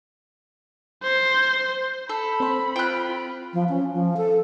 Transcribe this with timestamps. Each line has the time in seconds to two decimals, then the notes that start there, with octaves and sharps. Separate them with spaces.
1.03 C5
2.09 A4 B5
2.40 C4 C5
2.76 F4 G5 F#6
3.54 F3
3.69 C#4
3.93 F3
4.17 A4